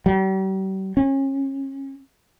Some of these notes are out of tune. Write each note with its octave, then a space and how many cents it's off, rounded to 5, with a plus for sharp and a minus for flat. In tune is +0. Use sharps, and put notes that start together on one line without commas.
G3 -45
C#4 -30